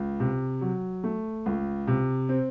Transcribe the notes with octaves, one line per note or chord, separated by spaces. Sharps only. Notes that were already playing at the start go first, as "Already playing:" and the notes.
Already playing: C#2
C3
F#3
A3
C#2
C3
C4